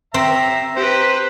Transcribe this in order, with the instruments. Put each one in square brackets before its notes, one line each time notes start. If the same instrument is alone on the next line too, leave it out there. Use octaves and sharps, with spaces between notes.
[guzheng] C4 [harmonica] E5 A#5
[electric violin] G4 B4 [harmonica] C5